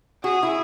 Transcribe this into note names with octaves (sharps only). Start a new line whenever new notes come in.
F#4 G#4
E4